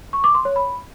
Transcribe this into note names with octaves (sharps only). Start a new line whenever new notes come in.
C#6
D6
C6
C#5
B5